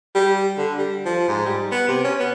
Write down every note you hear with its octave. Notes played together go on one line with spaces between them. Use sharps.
G3
D3
G3
F3
G#2
G3
B3
C3
C#4
B3